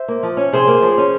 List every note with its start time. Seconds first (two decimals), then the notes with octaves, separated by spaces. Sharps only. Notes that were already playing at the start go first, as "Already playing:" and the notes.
Already playing: C5 E5
0.08 A#3
0.23 F3
0.37 C#4
0.53 C3 G#4 C5
0.67 A#3
0.82 F3
0.98 C#4